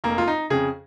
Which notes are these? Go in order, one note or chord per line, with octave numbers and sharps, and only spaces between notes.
F1 A#3
F4
D#4
F2 C#3 G#4